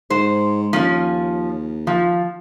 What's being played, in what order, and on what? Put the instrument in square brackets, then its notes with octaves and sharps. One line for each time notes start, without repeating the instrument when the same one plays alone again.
[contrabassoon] G#2 [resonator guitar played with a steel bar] C5
[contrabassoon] D#2 [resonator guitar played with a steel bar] F3 C#4
[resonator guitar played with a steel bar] F3